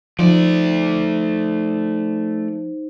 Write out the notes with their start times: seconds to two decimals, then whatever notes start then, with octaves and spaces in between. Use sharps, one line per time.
0.19 F3 A3 D#4 C5 D5